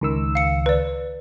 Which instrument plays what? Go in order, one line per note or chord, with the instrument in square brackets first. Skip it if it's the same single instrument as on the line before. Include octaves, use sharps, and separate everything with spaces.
[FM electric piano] C#2 D#3 E6
[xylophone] F5 C#7
B4 D5